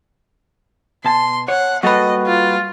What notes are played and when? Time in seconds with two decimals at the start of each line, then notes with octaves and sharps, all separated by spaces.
1.05 B2 A5 C6
1.48 C#5 F#5
1.83 G3 A#3 F#4 A4 B4 D#5
2.26 F4